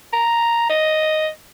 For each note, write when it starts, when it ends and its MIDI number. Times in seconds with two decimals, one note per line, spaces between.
0.12 0.66 82
0.69 1.28 75